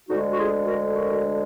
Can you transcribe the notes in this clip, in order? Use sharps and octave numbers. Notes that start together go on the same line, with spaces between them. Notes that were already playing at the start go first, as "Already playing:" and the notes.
D2 D3 G#3 D#4 F#4
F#4
F4 G#4
F#4 A#4
F#4 A#4